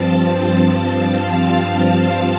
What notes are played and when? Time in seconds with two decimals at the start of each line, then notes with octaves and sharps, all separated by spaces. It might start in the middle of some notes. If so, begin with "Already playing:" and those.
Already playing: G2 F3 C4 A5
0.92 F5